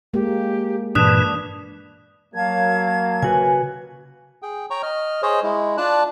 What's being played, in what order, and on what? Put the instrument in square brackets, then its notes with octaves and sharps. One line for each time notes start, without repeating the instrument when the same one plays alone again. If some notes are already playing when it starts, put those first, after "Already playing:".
[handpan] G#3 A#3 [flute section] G4
[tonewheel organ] G2 A#2 E3 [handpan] D4 [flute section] B4 A5 [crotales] D#6 F#6
[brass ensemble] F#3 A#3 [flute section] F5 A5 G#6
[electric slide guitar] C#3 F#4 B4 [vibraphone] G#5
[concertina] G#4 G5
C#5 G5 A#5 C#6
D#5 F6
G#4 C5 C#5 D#5
G#3 E4
D4 F4 D5 A5 F#6